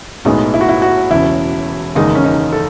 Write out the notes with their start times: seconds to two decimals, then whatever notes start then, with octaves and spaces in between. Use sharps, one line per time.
0.25 B1 A2 G#3 B3 D#4
0.54 E4
0.61 F#4
0.69 E4
0.82 F#4
1.11 E1 E2 C#3 E4
1.95 F#1 E2 D#3 G#3 D#4
2.15 C#4
2.24 D#4
2.53 A4